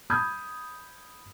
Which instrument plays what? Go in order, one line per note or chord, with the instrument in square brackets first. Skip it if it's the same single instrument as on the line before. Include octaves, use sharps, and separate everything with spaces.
[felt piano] B5 D#6 G6 G#6